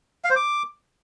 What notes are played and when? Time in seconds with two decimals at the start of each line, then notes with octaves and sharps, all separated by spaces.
0.25 F5
0.30 C5
0.36 D6